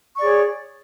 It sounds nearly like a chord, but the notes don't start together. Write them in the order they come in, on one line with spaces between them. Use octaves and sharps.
C#6 D5 G#4 C#5